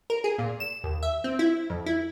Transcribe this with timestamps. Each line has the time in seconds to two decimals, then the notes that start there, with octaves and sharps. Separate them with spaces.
0.10 A#4
0.24 G#4
0.38 A#2
0.60 E7
0.84 D#2
1.03 E5
1.24 C4
1.39 E4
1.70 F2
1.86 E4